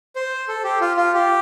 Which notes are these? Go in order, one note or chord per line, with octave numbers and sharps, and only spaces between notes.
C5
A4
G4
F4
F4
G4